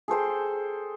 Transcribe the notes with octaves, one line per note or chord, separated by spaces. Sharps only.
G#4 A4 C5 G5